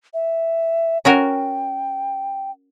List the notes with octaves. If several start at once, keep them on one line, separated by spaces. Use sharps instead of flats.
E5
C#4 F#4 A#4 G5